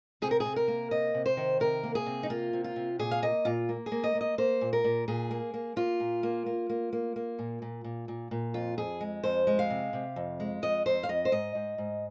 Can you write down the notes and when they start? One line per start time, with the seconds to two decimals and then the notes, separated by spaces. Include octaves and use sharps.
0.22 C3 G#4
0.31 A#4
0.40 G#4
0.45 C3
0.56 A#4
0.68 A#3
0.91 C3 D#5
1.14 C3
1.26 C5
1.37 D#3
1.60 C3 A#4
1.83 A#3
1.95 G#4
2.06 C3
2.23 D#4
2.30 A#3 F4
2.53 C3
2.64 F4
2.76 C3
2.99 A#2 G#4
3.11 F5
3.22 A#3 D#5
3.45 A#2 F4
3.69 A#3
3.86 G#4
3.92 A#3
4.04 D#5
4.15 A#3
4.21 D#5
4.38 A#3 C5
4.61 A#2
4.73 A#4
4.84 A#2
5.08 A#2 G#4
5.31 A#3
5.54 A#3
5.76 A#3 F4
6.00 A#2
6.23 A#3
6.46 A#3
6.70 A#3
6.93 A#3
7.16 A#3
7.39 A#2
7.62 A#2
7.84 A#2
8.08 A#2
8.31 A#2
8.54 F2 F4
8.78 F2 G#4
9.01 G#3
9.24 F2 C5
9.47 G#3
9.59 F5
9.70 C3
9.93 C3
10.16 F2
10.40 G#3
10.62 F2 D#5
10.86 F2 C5
11.03 F5
11.09 F2 D#5
11.25 C5
11.32 G#2 D#5
11.55 G#2
11.78 G#2